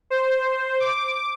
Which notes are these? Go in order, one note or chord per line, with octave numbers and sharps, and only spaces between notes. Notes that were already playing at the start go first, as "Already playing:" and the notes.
C5
D6